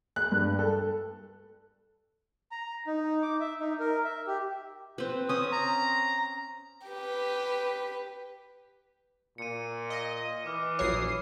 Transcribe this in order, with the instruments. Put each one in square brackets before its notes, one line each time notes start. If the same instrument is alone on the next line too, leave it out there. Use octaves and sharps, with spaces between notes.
[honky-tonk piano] F#6
G2
A4
[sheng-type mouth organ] A#5
D#4
D6
E5
D#4
A#4
E5
G4
[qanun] C4 B4
[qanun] C4 C#4 [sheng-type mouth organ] D#6
[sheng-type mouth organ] A#5
[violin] G4 B4
[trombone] A#2 [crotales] C#7 D#7
[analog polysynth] D#5
[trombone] E3 [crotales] D6 F6
[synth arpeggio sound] A#1 F#3 C#5 [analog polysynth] D#6 C7